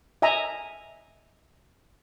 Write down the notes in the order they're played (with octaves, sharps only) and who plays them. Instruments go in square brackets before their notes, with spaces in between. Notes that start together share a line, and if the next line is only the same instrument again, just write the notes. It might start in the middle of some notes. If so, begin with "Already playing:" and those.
[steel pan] D#5 E5 G#5 A#5